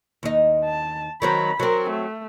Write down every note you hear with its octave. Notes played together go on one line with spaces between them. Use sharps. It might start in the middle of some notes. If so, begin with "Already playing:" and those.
D#2 D#4
A5
D#3 F#3 C4 A#5 B5
F#3 C4 A#4
A3